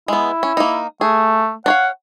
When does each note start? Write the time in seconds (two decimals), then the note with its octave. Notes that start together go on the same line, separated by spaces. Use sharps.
0.08 G#3 B3 E4
0.43 C#4
0.57 A#3 D#4
1.01 A3 G#4
1.66 D4 C#5 F5 F#5